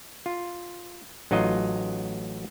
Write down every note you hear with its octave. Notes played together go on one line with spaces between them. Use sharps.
F4
A1 F#3 D#4 F4 D#5